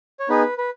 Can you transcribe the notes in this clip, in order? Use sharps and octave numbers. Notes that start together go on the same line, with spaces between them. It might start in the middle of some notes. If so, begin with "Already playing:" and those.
C#5
B3 D#4 G#4 B4
B4